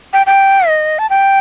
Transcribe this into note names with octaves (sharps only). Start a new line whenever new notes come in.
G5
G5
D#5
A5
G5